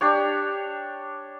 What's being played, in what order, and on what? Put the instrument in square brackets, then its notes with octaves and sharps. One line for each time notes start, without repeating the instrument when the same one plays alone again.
[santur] D4 G4 C#5